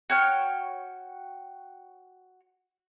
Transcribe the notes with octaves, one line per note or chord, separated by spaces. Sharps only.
F#4 C#5 G5 F6